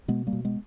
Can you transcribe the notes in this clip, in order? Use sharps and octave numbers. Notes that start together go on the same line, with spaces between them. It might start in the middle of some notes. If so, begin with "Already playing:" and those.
B2 G#3 B3
G3 A#3
B2
G#3 B3